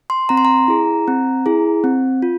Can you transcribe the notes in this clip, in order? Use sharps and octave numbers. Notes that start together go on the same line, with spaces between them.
C6
C4 A#5
C6
A#5
E4 G#4
C4
E4 G#4
C4
F4